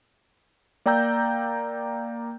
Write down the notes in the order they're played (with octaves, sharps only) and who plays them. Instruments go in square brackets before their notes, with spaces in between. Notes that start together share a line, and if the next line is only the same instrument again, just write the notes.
[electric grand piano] A#3 D5 G5 A#5 E6 G6